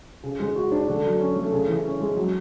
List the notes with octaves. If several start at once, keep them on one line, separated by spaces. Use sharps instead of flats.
C#3
G#3
F#4
D4
D3
F#3
C#4
A3
C#3
E3
C#4
G#3
F#3